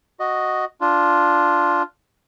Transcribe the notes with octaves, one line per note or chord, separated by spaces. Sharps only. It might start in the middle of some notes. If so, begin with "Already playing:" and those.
F#4 D#5
D4 F4